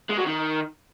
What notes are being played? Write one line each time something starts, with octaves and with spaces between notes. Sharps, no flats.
G#3
F#3
D#3